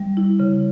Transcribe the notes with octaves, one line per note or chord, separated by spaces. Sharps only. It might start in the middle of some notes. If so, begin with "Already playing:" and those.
Already playing: G3
E4
C#3